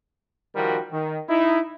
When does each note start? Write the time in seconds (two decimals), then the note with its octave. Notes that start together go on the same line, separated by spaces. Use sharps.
0.55 D#3 F3 G3 F#4 A#4
0.92 D#3
1.29 D#4 E4